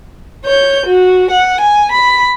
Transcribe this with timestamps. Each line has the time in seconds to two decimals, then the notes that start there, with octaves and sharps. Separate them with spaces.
0.45 C#5 G6
0.86 F#4
1.30 F#5
1.61 G#5
1.92 B5